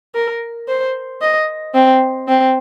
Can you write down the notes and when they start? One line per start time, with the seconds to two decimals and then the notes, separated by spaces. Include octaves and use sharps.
0.15 A#4
0.68 C5
1.21 D#5
1.74 C4
2.28 C4